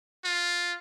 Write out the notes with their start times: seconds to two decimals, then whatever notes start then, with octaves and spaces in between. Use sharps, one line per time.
0.25 F4